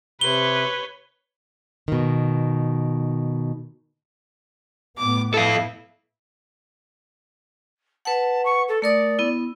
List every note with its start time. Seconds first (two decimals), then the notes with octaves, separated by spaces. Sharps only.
0.21 C3 B4 C#5 G7
1.88 B2 D#3
4.99 A2 B3 D6
5.34 E4 A4 F5
8.05 B4 F#5 A5
8.45 C#6
8.68 A4
8.82 A3 A#4 D5 D#6
9.19 B3 E4